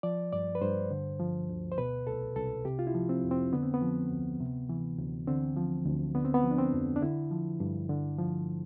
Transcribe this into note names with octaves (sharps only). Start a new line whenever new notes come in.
F3 D5
G2 D5
B4
G2 C5
D3
F3
D2
C5
B2 B4
C2 A4
C2 A4
C3 G4
F4
E4
F3
C4
F2
C4
D3 B3
C4
B3
F3
D2
C3
E3
D2
D3 C4
F3
D2
D3 B3
C4
B3
F3
D4
C4
F2
D4
D3 E4
F3
G2
D3
F3